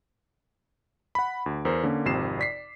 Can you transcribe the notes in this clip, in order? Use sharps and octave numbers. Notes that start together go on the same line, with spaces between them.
F#5 B5
D2
E2 A#4 C5
D3 A#3 C#4
G#1 F2 C3 C7 E7
D5 B6 C7